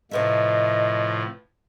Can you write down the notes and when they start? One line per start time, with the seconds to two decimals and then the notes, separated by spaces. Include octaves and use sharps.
0.11 A2 C3 F3 B4 D#5 E5